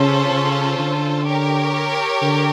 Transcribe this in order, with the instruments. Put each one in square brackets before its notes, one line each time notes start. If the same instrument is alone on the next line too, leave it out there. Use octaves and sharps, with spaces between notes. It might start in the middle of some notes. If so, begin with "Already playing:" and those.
Already playing: [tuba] C#3 [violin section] C#4 F4 A4 C5
[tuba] C#3
D3
[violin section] G4 A#4 C#5
[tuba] D3